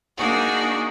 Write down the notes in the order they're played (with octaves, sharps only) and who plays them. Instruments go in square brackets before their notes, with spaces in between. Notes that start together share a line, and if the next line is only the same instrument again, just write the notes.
[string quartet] A#3 D4 D#4 F#4 G#4